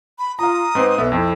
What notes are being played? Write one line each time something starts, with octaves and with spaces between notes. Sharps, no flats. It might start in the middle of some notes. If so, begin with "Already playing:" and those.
B5
F4 F5 A#5 D#6
G#2 C4 B4 C6
B1 B3 A4 E5
F2 E4